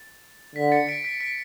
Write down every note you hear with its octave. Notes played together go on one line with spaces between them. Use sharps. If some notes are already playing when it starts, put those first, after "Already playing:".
Already playing: A6
D3 B6
A6 C#7
B6 D7
B6 D7
B6 D7